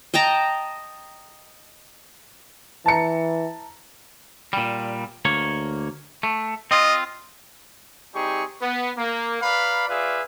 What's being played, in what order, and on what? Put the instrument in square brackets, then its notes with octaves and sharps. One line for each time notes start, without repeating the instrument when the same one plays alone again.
[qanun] D#5 G5 A5 A#5
[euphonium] E3 [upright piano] A5 A#5 C#7
[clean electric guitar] A#2 G3
D2 A#3 C#5
A3
[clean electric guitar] C4 F4 [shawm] D#5
[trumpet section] G3 C4 D#4 G4 G#4 C#6
B3
A#3
B4 D5 F5 A#5 B5
F4 G#4 B4 D5 E5 F5